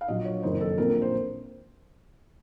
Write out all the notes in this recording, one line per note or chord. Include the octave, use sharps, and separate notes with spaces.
F5
A#1 A#2 F#3 A#3 F4 D#5
C#5
F#1 F2 D#3 A#3 D#4 C5
A4
A#1 A#2 F3 C4 A#4
A#4
C5